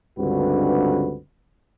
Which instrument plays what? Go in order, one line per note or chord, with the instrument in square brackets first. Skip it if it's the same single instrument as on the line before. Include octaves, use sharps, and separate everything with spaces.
[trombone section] C#2 G2 D3 C4 F#4 B4